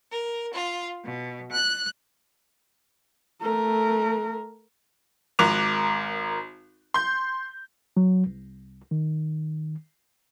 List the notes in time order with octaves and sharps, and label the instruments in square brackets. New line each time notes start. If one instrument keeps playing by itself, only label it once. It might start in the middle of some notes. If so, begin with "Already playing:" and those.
[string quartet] A#4
F4
B2
F#6
[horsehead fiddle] A3 A#4
[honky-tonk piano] G#1 A#4 D6 F#6 F7
C6 G6
[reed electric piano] F#3
C2
D#3